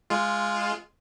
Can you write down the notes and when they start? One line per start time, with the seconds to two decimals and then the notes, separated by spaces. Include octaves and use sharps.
0.10 G#3 F4